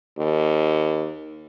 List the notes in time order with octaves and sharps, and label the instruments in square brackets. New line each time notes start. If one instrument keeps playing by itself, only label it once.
[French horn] D#2